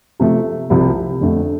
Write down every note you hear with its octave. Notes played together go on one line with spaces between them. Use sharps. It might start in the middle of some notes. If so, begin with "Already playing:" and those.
C3 F3 A3
C2 C3 F3
F2 D3 A3